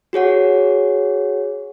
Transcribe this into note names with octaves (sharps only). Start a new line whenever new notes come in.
F#4 G#4 C#5 F#5